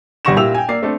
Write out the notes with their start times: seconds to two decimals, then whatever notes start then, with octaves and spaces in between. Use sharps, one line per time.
0.25 G1 G3 F#5 C#6 A#6 E7
0.36 A#2 E4 G4 E6 F7
0.54 G5 G#5
0.68 A#3 D5 C7
0.83 A3 C4 D4 A4